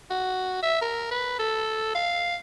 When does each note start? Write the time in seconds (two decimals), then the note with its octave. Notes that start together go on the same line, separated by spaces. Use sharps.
0.11 F#4
0.62 E5
0.81 A#4
1.11 B4
1.39 A4
1.95 F5